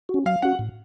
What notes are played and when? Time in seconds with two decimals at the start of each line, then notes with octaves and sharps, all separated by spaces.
0.09 F#4
0.14 C#4
0.26 F#3 F5
0.42 C#4 F#4 F#5
0.59 A2